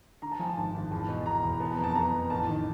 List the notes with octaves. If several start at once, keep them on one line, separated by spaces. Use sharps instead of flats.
D3 A#5
A5
F3 G#5
A5
G#1
G#1
E2 A5
B2
B2 A#5
E2
B3 A5
A#5
F2
A5
B3 A#5
F2
A1 A5
D#3